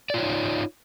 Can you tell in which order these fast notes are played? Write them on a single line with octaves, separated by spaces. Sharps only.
D5 F4 C#5 D#4